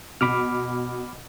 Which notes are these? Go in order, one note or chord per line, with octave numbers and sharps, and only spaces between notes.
B2 B5 D6 F6